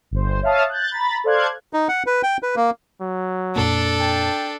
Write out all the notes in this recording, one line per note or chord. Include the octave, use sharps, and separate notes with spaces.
G1 C5
C#5 E5 F5 A5 D#6
F#6 G6 A6
A#5 B5 A6
A4 C5 D5 F5 F#6 G#6
D#4
F#5
B4
G5
B4
A#3
F#3
F2 A#2 A#3 D4 A4
G5